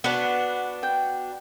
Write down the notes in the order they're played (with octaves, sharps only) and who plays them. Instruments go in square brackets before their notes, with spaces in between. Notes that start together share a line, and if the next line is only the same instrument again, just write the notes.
[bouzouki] B3 D4 F#4 [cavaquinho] F#5
[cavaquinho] G5